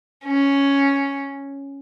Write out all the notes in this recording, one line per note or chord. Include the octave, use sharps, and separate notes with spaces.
C#4